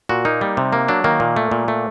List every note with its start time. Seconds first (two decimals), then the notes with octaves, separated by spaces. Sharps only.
0.09 A#2 F#4
0.25 A#3 D#4
0.41 G3
0.57 C3
0.73 A#3
0.88 F#3 D4
1.04 D#3 A#3
1.20 A#2
1.36 A3
1.51 A#2
1.68 A3